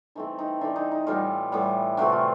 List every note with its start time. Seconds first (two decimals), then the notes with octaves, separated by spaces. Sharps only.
0.15 E3 A3 C4 D#4
0.39 D#4
0.61 E3 A3 C4 D4
0.76 D#4
0.91 D#4
1.07 A2 E3 G3 B3 F4
1.52 A2 E3 G3 B3
1.97 C3 E3 A3 C4 F#4
2.12 F4